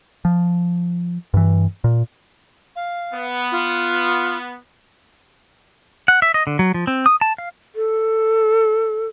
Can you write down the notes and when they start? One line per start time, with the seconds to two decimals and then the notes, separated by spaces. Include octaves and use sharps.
0.25 F3
1.34 G2 E3
1.84 A#2
2.76 F5
3.14 B3
3.52 F4
6.08 F#5
6.22 E5
6.34 D#5
6.47 D3
6.59 F#3
6.74 F3
6.87 C4
7.06 D#6
7.21 A5
7.38 F5
7.76 A4